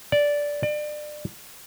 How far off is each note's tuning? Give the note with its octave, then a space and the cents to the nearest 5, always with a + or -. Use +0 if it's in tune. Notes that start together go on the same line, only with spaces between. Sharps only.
D5 -10
D5 +30